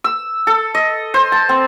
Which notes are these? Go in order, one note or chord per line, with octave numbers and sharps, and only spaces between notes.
E6
A4
D#5
C5
A5
C4